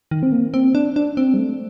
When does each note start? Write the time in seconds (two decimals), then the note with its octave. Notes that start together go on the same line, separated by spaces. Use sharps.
0.11 D#3
0.23 C4
0.32 A#3
0.54 C4
0.75 D4
0.96 D4
1.17 C4
1.34 G3
1.38 A3